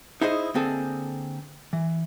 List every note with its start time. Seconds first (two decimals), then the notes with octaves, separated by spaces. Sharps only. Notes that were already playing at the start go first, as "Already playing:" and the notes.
0.21 D#4 E4 G#4 C5 D5 D#5
0.54 D3 A#3 C4 G#4 A4
1.73 E3